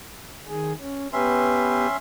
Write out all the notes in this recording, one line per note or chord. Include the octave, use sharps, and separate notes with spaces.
D#3 G#4
C#4
B3 C#4 G4 B4 E5 C6